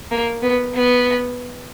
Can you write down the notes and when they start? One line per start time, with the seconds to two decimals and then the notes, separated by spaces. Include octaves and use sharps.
0.11 A#3
0.42 B3
0.75 B3